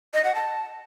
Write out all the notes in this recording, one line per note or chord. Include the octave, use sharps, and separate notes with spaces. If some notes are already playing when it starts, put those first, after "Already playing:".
D#5
F#5
A5